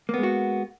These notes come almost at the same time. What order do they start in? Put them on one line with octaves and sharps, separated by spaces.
A#3 B3 G#3 F#4